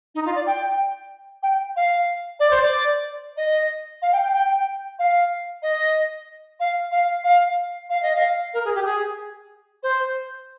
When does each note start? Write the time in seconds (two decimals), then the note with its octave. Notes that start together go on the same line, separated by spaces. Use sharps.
0.14 D#4
0.25 F4
0.35 D5
0.46 G5
1.42 G5
1.76 F5
2.39 D5
2.50 C5
2.61 D5
3.37 D#5
4.02 F5
4.12 G5
4.23 G5
4.33 G5
4.99 F5
5.62 D#5
6.60 F5
6.91 F5
7.24 F5
7.89 F5
8.02 D#5
8.15 F5
8.53 A#4
8.64 G#4
8.74 G4
8.85 G#4
9.83 C5